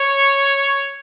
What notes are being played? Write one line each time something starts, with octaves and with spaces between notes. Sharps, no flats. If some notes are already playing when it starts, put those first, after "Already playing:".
Already playing: C#5